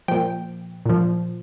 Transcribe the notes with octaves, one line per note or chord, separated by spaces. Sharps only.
A#2 F3 G5
A#2 F3